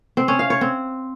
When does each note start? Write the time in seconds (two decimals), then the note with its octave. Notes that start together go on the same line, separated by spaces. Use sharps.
0.17 C4
0.28 C#4
0.39 F5
0.50 C#5
0.61 C4